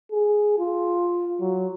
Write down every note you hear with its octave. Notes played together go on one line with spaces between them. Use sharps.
G#4
F4
F#3